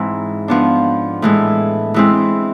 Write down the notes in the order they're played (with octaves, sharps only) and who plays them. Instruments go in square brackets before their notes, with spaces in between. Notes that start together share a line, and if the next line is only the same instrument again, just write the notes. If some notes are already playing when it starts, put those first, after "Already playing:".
Already playing: [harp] G#2 E3 G#3 C4
F3 B3 D4
A2 E3 G#3
E3 G#3 C4 E4